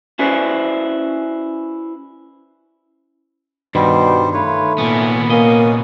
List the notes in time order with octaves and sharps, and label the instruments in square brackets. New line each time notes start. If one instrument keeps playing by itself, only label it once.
[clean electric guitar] C#4 E4 F#4 B4 C5 D5
[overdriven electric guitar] G2 [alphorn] B2 [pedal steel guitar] D#3 [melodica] G3 C5
[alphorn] A3 [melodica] F4 B4 C#5
[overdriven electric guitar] A#2 B3 [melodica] C#4 E4
[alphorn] A#3 [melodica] C#4 [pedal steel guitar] D#5